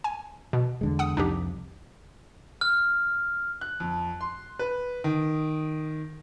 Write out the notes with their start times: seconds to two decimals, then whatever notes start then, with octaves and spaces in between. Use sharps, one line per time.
0.04 G#5
0.53 B2
0.81 E2 D3 G#3
0.99 F#5 D#6
1.17 C2 F2 D4 D#4 G4
2.61 F6
3.61 F#6
3.80 F2
4.21 C6
4.59 B4
5.04 D#3